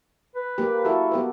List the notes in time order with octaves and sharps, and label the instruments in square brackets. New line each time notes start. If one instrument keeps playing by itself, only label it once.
[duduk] B4
[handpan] A#3 G4
[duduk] E4 [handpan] F#4 A4
[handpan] B3 G4 B4